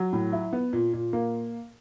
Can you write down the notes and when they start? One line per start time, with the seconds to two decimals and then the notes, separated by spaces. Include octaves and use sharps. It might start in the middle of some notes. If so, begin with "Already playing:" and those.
Already playing: F#3
0.13 A2
0.33 E4
0.53 B3
0.73 A#2
0.93 A#2
1.13 A#3